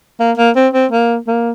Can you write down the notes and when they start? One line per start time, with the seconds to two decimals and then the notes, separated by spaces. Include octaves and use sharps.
0.20 A#3
0.38 A#3
0.56 C4
0.74 C4
0.92 A#3
1.28 A#3